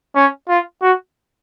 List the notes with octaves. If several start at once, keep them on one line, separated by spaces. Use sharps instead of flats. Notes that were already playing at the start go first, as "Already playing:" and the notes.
C#4
F4
F#4